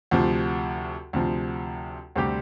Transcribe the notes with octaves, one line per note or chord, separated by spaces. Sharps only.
D2 C3 F3
D2 C3 F3
D2 C3 G3 C4 G4